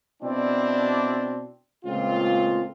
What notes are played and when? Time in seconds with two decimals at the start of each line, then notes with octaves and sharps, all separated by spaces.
0.22 B2 C4 D4 E4 D5
1.85 C#2 A#2 A3 C4 F4